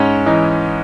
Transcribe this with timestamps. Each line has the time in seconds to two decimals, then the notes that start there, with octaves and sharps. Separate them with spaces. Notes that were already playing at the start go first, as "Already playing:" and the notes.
Already playing: G#2 C#4
0.26 E3 D#4